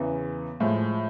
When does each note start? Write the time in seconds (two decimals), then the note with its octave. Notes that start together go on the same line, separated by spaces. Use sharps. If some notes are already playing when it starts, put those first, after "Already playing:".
Already playing: E2 C#3 E3
0.60 A2 F3 G#3